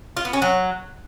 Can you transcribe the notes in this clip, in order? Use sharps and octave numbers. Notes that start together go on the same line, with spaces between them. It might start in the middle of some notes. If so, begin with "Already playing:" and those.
F4
B3
C#4
F#3